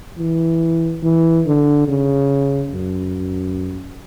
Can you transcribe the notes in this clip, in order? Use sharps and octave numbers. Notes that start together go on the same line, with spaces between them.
E3
E3
D3
C#3
F#2